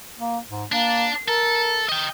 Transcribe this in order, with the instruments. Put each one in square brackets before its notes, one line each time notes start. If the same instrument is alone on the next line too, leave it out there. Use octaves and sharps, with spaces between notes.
[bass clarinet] A#3
G#2
[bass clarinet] A#3 [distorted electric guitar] D4
[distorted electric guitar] A4 [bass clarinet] A#4
[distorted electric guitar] D#5 G5